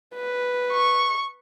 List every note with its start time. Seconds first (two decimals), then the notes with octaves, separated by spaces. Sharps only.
0.15 B4
0.73 C#6